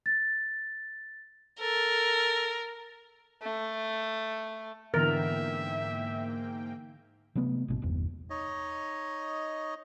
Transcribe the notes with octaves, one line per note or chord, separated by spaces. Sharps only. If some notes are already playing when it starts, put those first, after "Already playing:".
A6
A4 A#4
A3
G#2 D3 E3 A#3 B3 A#4 E5 G5
C3 F#3 A3 B3
G#1 B2
G1 E2
D#4 C#5 D#5